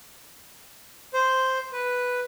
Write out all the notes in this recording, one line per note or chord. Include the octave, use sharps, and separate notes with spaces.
C5
B4